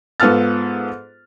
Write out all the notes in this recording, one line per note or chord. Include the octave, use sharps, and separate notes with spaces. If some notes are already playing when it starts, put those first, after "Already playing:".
G#2 B3 F4 A4 F6 A6